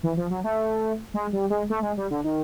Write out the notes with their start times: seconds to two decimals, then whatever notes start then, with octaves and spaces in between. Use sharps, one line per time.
0.03 E3
0.17 F3
0.30 F#3
0.44 A3
1.14 G#3
1.33 G3
1.50 G#3
1.70 A3
1.82 G#3
1.97 G3
2.11 D3
2.24 D#3